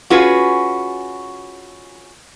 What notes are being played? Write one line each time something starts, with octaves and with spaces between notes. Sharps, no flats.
C#4 F4 F#4 G#4 B4